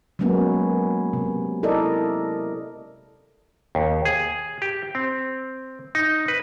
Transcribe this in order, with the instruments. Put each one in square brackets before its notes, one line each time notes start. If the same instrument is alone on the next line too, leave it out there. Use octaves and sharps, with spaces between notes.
[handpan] F#3 G#3 A#3 B3 C#4
C3
E4 A4 A#4 D5 D#5
[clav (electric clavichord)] D#2
G#4
G4
C4
D#4
B4